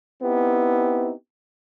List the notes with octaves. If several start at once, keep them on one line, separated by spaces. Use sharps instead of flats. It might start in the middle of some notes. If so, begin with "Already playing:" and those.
B3 C4 D#4 E4 G4